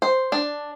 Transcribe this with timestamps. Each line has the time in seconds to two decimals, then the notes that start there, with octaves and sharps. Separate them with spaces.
0.02 C5
0.32 D4